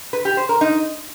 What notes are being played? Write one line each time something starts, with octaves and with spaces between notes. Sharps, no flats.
B4
G4
C5
A#4
D#4